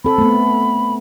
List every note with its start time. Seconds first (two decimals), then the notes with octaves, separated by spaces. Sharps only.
0.05 C4 A4 B5
0.18 A3 B3